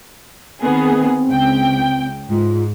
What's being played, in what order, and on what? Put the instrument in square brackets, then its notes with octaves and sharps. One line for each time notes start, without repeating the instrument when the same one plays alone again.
[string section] D#3 B3 G#4 [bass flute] C4
[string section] C#2 G5
[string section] G#2 [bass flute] F4